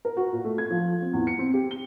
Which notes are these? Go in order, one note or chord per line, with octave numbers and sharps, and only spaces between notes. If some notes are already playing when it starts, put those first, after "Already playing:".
A#4
F#4
A#2
A3
G#6
F3
C4
E2
C#7
C4
G4
G7